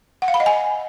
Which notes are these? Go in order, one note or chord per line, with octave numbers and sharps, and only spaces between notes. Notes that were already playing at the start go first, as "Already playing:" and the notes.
F#5
F5
B5
D#5
G#5